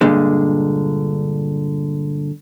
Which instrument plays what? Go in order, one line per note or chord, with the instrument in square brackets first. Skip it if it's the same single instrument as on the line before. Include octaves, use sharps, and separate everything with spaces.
[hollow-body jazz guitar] G2 A#2 D3 G#3